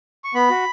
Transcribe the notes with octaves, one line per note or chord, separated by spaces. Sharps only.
C#6
B3 B5
F#4